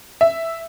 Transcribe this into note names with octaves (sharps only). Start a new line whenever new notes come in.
E5